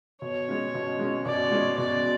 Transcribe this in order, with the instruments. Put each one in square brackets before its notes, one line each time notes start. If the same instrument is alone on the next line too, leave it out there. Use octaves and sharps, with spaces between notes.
[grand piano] B2 [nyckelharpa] C#5
[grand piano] G#3 C#4
B2
G#3
C#4
[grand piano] B2 [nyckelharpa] D5
[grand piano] G#3 C#4
[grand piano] B2 [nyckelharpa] D5